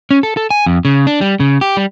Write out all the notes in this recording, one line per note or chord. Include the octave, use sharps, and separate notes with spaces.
C#4
A4
A4
G#5
F2
C#3
D4
G3
C#3
G4
G3